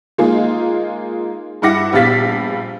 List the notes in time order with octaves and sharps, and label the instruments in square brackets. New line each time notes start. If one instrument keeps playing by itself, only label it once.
[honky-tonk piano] G#3 A#3 D#4 F4 G#4
G2 E4 F#5 D6 A#6 C#7
A#1 G3 B3 F5 A6 B6